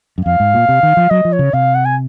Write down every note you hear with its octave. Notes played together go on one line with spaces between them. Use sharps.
F#2
F2 F5
G#2
A#2
C3
D#3
F3
F#3 D#5
F3
C#5
C#3
C3 F5
F#5
G#5